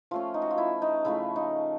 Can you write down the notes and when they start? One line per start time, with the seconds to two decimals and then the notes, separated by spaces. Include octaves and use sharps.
0.11 F3 A3 C#4 F4
0.34 D#4
0.42 F#4
0.51 F4
0.58 E4
0.82 D#4
1.05 C#3 F3 A3 E4
1.36 D#4